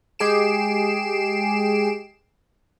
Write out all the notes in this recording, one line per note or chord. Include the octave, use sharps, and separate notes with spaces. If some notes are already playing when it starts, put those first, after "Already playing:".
G#3 G4 G#4 C7 D7 E7